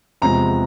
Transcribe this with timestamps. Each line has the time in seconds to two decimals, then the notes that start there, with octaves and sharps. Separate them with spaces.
0.22 E2 C3 F3 G#3 A#5